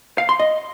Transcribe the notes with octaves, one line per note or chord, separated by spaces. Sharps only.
F5
C6
D#5